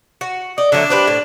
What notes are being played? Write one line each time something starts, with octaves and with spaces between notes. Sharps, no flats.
F#4
D5 D#5
D3 F#3 A3 D4
G4 B4 C5
A2